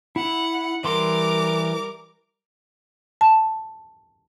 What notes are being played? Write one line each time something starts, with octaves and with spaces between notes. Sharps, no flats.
E4 F#5
E3 G3 A#4 C6 D6
A5